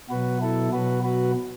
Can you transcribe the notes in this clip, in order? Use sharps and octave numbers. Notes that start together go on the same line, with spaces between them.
B2 F#3 F#4 B4
E4 A4
B2 F#3 F#4 B4
F#4 B4